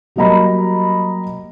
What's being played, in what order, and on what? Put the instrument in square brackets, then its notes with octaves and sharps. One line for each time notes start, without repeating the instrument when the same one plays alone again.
[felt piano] F#3 G3 A#3 D#5 A#5 B5